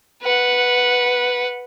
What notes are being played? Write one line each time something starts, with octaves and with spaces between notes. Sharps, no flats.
B4 F#5